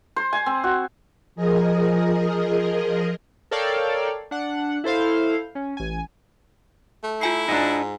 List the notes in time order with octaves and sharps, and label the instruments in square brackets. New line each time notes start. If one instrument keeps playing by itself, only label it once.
[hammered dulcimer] C5
G#5
C4
F#4
[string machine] F3 G#4 A#4 D#5
[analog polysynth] A4 A#4 C#5 D5 F5 G5
D4 F#5
E4 A4 C5 F5
C#4
A1 G#5
[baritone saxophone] A3
[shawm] E4 [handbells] F4 G#5 C7
[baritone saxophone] G#2 [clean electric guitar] D4 D#4